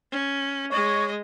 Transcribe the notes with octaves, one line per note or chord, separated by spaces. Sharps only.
C#4
G#3 C#5 D#5